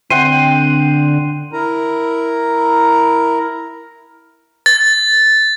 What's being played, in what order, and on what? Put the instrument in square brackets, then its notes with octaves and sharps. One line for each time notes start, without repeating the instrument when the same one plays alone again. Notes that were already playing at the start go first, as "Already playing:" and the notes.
[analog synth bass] D3 [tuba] C4 [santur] F#5 G5 C6 [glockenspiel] D#7
[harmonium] E4 A#4 A#5
[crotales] A6